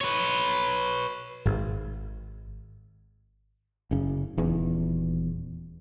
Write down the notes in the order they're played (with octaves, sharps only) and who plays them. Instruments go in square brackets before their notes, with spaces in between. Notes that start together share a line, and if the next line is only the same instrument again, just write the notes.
[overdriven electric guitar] B4 C#5
[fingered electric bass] G#1
F#1 C#3
D#1 E2